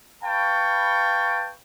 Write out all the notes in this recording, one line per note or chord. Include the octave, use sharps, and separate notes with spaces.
B4 F5 G5 A5 B5 C#6